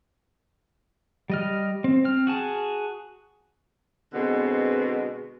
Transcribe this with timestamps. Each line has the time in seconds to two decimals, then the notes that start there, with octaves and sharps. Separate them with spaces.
1.30 G3 D#5 F6
1.84 C4
2.04 C4 F6
2.27 F#4 G#4 A5
4.13 B2 D3 G#3 B3 C4